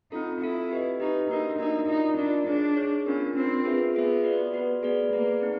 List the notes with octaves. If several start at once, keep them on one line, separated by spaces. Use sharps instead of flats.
C4 D#4 F4 A4
C4 E4 F4 A4
G4 B4 D#5
D#4 G4 B4 D#5
A#3 D4 D#4 F#4 A#4 D#5
A#3 D4 D#4 F#4 A#4 D#5
D#4 F4 A#4 D5
D4 F4 A#4 D5
D4 D#4 G#4 C#5
D#4 G#4 C#5
B3 C#4 D4 F4 A#4
B3 C4 D4 F4 A#4
F4 G#4 B4 E5
B3 F4 G#4 B4 E5
F#4 B4 D5
F#4 B4 D5
B3 G#4 B4 D5
A#3 G#4 B4 D5
C4 D#4